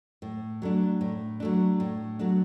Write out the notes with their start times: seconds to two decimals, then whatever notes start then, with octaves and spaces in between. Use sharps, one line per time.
0.22 A2
0.62 F#3 A3 D4
1.01 A2
1.40 F#3 A3 D4
1.80 A2
2.19 F#3 A3 D4